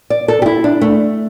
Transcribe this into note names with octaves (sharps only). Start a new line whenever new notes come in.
D5
A4
G4
E4
D4
A3